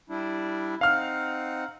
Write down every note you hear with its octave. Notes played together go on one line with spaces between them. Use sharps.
G3 D4 E4
C4 D#4 F5 F#5 F6